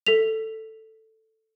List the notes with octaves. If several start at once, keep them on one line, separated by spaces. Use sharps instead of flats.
A4 B6 F7